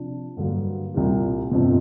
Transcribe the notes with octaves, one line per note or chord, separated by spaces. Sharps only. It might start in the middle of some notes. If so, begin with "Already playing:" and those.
Already playing: C3 F3 D4
G2 D3 F#3 A#3
C2 A#2 G3
G1 F2 C3